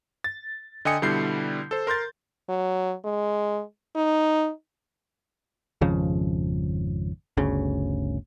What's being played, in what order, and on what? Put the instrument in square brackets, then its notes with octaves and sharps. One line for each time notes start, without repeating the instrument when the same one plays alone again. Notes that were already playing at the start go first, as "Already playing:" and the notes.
[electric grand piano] A6
D3 D#5 G5 G#5 D#6 C#7
B2 D3 G3 E4 G6 C7
A4 C5
A#4 C6 G6 A6
[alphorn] F#3
G#3
D#4
[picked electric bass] G#1 F2 C#3 F3
G1 D2 C#3